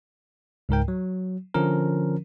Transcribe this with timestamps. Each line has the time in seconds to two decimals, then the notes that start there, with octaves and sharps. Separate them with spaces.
0.69 C#2 G#2 A#4 G5
0.88 F#3
1.54 D3 F3 C#4 A#4